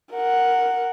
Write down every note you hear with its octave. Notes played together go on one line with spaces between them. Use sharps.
A#4 F#5